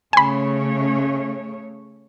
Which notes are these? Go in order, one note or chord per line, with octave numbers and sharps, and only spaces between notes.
C#3 A3 C#5 G#5 B5